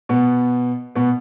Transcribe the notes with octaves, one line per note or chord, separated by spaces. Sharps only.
B2 B3
B2 B3